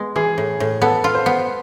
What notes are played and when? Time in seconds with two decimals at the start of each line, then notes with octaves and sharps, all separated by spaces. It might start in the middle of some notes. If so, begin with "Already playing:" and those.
Already playing: G#3 B3
0.16 E3 G#4
0.38 A2
0.60 A2
0.82 B3 A4
1.04 F4
1.15 C5
1.26 B3